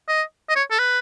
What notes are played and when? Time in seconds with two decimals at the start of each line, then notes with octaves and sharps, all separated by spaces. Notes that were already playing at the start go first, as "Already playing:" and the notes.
0.08 D#5
0.49 D#5
0.56 C#5
0.71 A4
0.79 B4